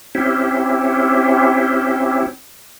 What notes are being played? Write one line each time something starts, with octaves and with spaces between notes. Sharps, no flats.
C4 C#4 E4 G4